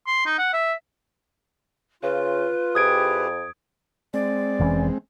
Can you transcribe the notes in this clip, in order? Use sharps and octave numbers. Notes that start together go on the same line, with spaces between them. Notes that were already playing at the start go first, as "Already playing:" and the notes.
C6
D#4
F#5
E5
C#3 F4 B4
F2 E4 G4 G#4 D#6 G#6 D7
G#3 C4 D5
F1 E3 C#4